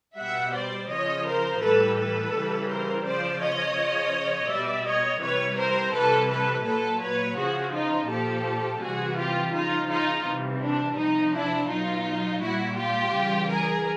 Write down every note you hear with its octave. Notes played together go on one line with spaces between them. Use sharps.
B2 G3 E5 F#5
C5 D5
C#3 F3 C#5 D#5
A#4 C5
A2 E3 G3 A4 B4
A4 B4
C#3 E3 G3
A#4 C5
C#3 F3 C5 D5
C#5 D#5
C#3 F3
B2 G3 D5 E5
C#5 D#5
C3 E3 G3 B4 C#5
A#4 C5
C3 E3 G3 A4 B4
A4 B4
A#2 F#3 A4 B4
B4 C#5
C#3 F3 F#4 G#4
D#4 F4
A#2 F3 G4 A4
C3 E3 G3 F#4 G#4
F4 G4
C#3 F3 D#4 F4
D#4 F4
C3 E3 G3
D4
C3 F3 D#4
D4 E4
B2 F#3 D#4 F4
A#2 G3 E4 F#4
F4 G4
C#3 E3 G3
G#4 A#4